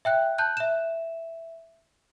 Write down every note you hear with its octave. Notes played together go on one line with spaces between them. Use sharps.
E5 G5 F#6
A5 F#6 G6
E5 E7